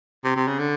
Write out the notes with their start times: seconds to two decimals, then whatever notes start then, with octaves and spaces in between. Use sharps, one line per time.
0.24 C3
0.36 C3
0.48 C#3
0.59 D3